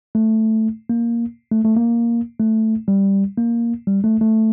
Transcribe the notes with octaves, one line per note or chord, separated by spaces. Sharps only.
A3
A#3
A3
A3
A#3
A3
G3
A#3
G3
A3
A3